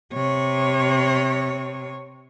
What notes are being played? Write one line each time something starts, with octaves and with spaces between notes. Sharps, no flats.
C3 C#5